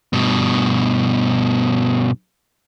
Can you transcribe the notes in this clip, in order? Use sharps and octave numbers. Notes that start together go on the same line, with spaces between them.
G2 B2